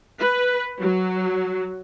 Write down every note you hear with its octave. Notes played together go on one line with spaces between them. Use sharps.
B4
F#3